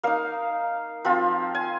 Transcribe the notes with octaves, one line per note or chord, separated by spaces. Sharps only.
A#3 D#4 F5
F3 C4 F4
G#5